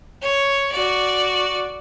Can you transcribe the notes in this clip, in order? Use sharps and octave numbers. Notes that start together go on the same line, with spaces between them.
C#5
F#4 D5